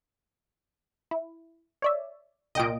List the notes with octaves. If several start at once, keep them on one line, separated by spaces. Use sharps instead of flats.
E4
C#5 D5 E5
C2 A#2 D#5 G5 D7